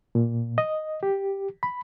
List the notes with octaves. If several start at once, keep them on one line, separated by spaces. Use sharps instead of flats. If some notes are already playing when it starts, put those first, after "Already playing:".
A#2
D#5
G4
B5